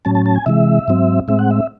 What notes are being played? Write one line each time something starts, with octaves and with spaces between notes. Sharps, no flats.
A2 F#3 C#4 A5
A5
A5
G#5
C3 E3 G#3 E5
G#2 F#3 C4
A2 G#3 C4 E5
F#5
E5